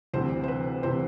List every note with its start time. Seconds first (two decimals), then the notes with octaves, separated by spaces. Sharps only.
0.14 D2 C3 E3 C5
0.44 C5
0.48 B4
0.83 C3 E3 C5